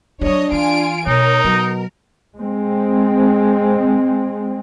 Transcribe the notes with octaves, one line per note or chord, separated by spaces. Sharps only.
F#3 G3 D4 C#5 D#5
E3 F4 G#5 D7
B2 D#4 A#4 C#5
B2 F#3
G#3 C4